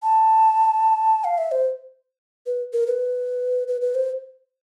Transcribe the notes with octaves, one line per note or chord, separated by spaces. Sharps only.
A5
F5
E5
C5
B4
A#4
B4
B4
B4
C5